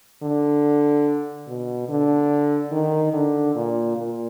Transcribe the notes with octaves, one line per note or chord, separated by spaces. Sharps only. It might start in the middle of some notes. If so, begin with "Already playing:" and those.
D3
B2
D3
D#3
D3
A#2
A#2